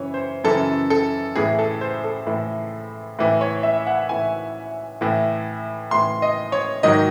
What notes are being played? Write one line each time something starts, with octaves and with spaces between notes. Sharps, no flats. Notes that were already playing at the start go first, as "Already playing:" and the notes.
Already playing: F#2 C#3 E3 C#5
C5
F#2 C#3 E3 A4
A4
A2 E3 G#4
A4
C5
A4
A2 E3
A2 E3
C#5
E5
F#5
A2 E3 G#5
A2 E3
A2 E3 C6
D#5
C#5
G#2 D#3 F#3 D#5